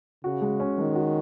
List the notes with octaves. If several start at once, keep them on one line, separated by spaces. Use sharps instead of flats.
C#3 F#4
G#3
C#4
D#3 G#3
F#4